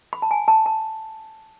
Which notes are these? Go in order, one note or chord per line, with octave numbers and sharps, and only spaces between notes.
B5
A5
G#5
A5
A5